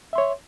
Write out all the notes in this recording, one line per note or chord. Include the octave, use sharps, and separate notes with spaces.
C#5 E5 C6